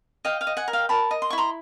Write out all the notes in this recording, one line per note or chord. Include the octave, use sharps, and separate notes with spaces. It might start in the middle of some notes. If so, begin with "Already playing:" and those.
D#5 F5 G5
F5 G5
D#5
F#5 G#5
A#4
F5 G5
A#4 A5 B5
D#5
C6
E4 C#6
A#5 C6